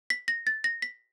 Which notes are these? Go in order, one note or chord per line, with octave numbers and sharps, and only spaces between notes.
B6
A#6
A6
A#6
B6